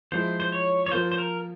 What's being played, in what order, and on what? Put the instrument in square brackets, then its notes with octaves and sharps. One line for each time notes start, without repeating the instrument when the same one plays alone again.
[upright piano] F3 G#3 E4 [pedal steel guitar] C5
[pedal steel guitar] C5
C#5
C#5
[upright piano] F3 A#3 F4 [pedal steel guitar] C5
[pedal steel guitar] C5
A#4